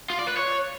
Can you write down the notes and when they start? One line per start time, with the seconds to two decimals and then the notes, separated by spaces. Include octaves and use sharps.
0.10 F4
0.19 D5
0.28 B4
0.37 C#5